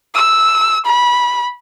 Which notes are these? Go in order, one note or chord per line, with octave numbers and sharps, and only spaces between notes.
E6
B5